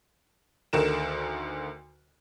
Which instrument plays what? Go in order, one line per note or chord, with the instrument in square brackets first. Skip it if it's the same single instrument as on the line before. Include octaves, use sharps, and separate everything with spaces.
[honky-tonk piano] D2 D3 D#3 A#4 E7